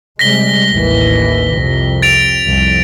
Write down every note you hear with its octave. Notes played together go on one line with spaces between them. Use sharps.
C3 G3 G#3 A#6 B6 G7
A1 D#2 E3
C2 F2 C3
A6 D7 F7
C2 F2